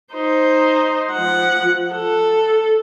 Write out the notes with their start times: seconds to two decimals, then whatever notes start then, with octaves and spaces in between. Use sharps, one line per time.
0.14 D#4 C5
1.12 F3 F#5
1.93 A4